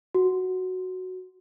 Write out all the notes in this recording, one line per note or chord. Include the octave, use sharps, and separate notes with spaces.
F#4